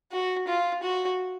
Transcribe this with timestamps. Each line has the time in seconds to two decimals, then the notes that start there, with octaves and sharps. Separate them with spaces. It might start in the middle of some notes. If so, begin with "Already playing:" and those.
0.12 F#4
0.48 F4
0.83 F#4